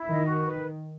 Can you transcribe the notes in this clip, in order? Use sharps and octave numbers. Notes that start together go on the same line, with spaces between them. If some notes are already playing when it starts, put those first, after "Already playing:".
Already playing: E4
D#3 D#5
F#4
B4